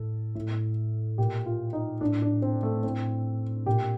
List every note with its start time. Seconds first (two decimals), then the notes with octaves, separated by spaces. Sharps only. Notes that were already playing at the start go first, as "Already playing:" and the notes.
Already playing: A2 A4
0.35 A2
1.18 A#2 G4
1.46 F4
1.73 D#4
2.01 A2 D4
2.22 D4
2.42 C4
2.63 A3
2.84 A2 C4
3.66 A#2 G4